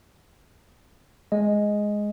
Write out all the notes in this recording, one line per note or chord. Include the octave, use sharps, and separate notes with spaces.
G#3 D#5